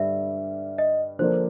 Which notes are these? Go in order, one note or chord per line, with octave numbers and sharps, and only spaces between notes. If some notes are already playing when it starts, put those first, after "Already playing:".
Already playing: G2 D3 G3 E5
D#5
D3 F3 A#3 D4 C5